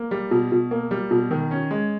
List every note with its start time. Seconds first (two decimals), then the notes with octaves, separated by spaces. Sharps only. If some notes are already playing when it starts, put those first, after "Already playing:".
Already playing: A#3
0.11 G3
0.31 B2
0.52 B2
0.71 A#3
0.91 G3
1.11 B2
1.31 D#3
1.51 C#4
1.71 G#3